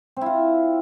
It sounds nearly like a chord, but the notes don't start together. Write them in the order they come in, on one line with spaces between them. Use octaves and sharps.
C4 E4 F4